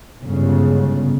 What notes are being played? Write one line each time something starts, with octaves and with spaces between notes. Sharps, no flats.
G1 G#2 C#3